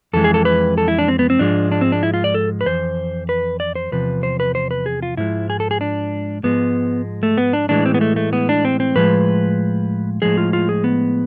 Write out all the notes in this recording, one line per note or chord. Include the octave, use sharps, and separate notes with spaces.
F2 E3 G#3 A4
G#4
A4
B4
A4
E4
D4
C4
B3
C4
G#2 F3 G#3 D4
D4
C4
D4
E4
F4
D5
A4
B4
F2 E3 C5
B4
D5
C5
E2 C3 F3 B4
C5
B4
C5
B4
G#4
F4
G#2 F3 G#3 E4
G#4
A4
G#4
D4
G#2 F3 G#3 B3
A3
B3
D4
A2 E3 G#3 D4
C4
B3
A3
A3
B3
D4
C4
C4
A2 F3 G#3 B4
A2 F3 G#3 G#4
F4
F4
G#4
B3